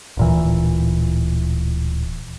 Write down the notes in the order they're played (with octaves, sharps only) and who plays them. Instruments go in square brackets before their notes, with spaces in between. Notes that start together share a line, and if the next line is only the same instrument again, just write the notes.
[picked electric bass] D1 A#2 E3